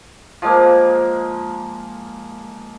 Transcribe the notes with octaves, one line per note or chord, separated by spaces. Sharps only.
F3 G#3 A#3